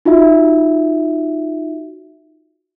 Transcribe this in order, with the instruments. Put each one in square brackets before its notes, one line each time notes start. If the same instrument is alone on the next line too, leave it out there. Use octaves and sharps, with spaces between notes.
[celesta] D#4 F4 F#4 E5